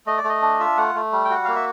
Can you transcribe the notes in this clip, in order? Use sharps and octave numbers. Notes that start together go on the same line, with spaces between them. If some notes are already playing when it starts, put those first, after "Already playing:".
A3 D#5
D5
A3
D#5
D4
F4 E5
A3 F#5
A3
G3
G5
F#4 F#5
A#3 F5
E5